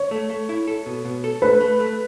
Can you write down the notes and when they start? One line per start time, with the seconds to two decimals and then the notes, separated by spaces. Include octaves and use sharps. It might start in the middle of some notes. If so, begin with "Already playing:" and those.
Already playing: C#5
0.11 A3
0.30 A3
0.49 E4
0.68 A4
0.86 B2
1.05 B2
1.24 A4
1.42 A3 B4
1.60 A3
1.80 A3